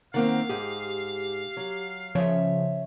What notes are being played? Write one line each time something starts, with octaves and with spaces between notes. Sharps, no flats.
D#3 A#3 C4 F5 F#5
G#2 G4 G#4
F#3
C#3 F3 C#5 E5